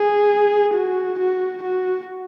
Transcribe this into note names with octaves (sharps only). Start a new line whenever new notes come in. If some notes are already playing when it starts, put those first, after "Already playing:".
Already playing: G#4
F#4
F#4
F#4